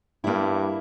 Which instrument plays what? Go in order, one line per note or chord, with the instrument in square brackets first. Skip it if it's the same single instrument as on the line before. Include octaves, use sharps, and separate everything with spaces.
[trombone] G2 [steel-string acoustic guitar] A#3 E4